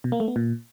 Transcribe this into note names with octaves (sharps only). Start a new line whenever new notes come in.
B2
A#3
A3
B3
A#2